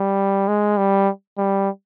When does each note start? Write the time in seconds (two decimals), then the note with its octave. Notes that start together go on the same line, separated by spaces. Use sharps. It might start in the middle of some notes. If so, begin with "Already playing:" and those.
Already playing: G3
0.48 G#3
0.78 G3
1.38 G3